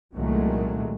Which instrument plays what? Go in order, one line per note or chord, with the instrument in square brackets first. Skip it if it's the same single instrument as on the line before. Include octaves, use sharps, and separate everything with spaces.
[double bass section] C2 A#2 D#3 F#3 G#3 A3